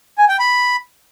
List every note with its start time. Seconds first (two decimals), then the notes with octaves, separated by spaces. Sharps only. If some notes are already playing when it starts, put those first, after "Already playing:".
0.18 G#5
0.29 G5
0.39 B5